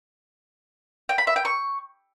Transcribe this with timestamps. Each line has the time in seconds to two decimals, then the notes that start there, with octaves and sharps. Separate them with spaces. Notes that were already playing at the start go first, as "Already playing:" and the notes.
1.09 G5
1.18 B5
1.27 E5
1.36 G5
1.45 C#6